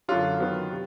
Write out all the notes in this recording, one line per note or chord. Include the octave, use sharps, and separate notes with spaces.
F#2 D3 F#3 F4
D#3 F#3 B3
C3